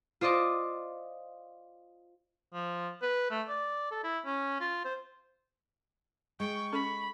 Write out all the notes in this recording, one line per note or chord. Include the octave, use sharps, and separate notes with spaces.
F4 C5 D5 D#5 D6
F3
B4
A3
D5
A4
E4
C#4
F4
C5
G#3 G5 C#6
C#4 A4 B5